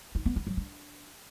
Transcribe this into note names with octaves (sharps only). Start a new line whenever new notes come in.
D#4
B3
E4
F#3
D4